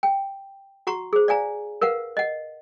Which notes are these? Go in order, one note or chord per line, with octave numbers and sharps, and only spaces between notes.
G5
F#4 F#5 A#5 C#6
G#4 C5
D5 F5 G#5 A#5
A#4 B4 F5 F#5
D#5 F#5